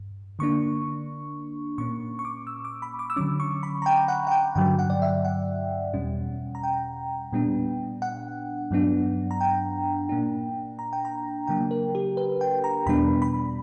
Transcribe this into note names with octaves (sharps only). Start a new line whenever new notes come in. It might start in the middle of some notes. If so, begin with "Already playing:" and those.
Already playing: G2
D3 A#3 D4 C#6
A#2 A#3 C#4 C#6
C#6
D6
E6
D6
B5
D6
E6
D3 F#3 C#4 D6
C#6
B5
A#5
G5
F#5
F#5
G5
G2 D3 F#3 G5
F#5
D5
E5
F#5
E2 B2 G3 C#4
A#5
G5
A#2 G3 B3 D4
F#5
G2 F#3 B3 D4
A#5
G5
A#2 A#3 D4
A#5
G5
A#5
C#3 F#3 A#3 D4 G5
A#4
G4
B4
G5
A#5
E2 B2 G3 B3 D4 B5
B5